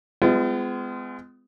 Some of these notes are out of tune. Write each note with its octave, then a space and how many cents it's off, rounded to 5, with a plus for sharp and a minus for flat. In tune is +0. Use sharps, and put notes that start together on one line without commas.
G#3 +0 B3 +45 F4 -25